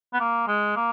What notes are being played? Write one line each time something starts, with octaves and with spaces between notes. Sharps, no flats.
B3
A#3
G#3
A#3